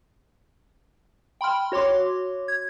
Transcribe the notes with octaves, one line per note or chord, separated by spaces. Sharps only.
G5 B5 C6 F6
F#4 C#5 C6 D6
G#6